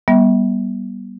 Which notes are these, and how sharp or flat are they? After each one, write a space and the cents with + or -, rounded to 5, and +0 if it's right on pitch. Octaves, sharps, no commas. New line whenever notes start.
G3 -10 B3 -35 E5 -30